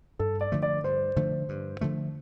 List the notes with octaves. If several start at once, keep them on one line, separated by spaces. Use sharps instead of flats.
G2 A4
D5
D3 F3 A3
D5
G2 C5
D3 F3 A3
G2
D3 F3 A3